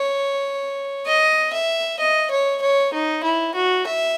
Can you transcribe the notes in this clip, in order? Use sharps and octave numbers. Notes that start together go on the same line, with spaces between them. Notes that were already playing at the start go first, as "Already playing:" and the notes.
Already playing: C#5
D#5
E5
D#5
C#5
C#5
D#4
E4
F#4
E5